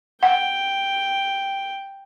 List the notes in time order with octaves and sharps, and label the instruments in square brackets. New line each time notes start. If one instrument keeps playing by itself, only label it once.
[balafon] F#5 [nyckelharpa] G5